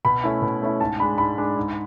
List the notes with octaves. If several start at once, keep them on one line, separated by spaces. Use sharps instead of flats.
B2 B5
A3 C#4 E4
B2
A3 C#4 E4
G#2 A5
G#3 D4 B5
G#2 B5
G#3 D4
G#2